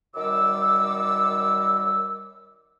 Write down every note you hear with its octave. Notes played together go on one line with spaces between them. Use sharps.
F#2 D#3 G3 D6 E6